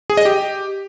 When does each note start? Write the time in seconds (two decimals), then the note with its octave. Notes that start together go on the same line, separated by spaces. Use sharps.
0.10 G#4
0.17 D#5
0.25 G4